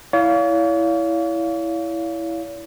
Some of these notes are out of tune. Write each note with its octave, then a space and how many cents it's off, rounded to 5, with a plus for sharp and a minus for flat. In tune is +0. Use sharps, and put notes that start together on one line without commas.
E4 +0 C#5 +45 F5 +0